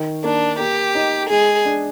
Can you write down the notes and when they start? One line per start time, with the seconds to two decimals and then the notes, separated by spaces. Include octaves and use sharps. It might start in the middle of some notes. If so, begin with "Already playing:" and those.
Already playing: D#3
0.24 A#3 D4
0.59 A#3 G4
0.95 D#4
1.29 G#3 G#4
1.65 D4